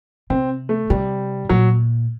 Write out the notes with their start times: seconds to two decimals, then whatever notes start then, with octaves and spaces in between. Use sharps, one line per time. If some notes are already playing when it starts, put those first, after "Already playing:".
0.30 C3 C4
0.69 A3
0.90 C3 G3
1.49 A#2 F#3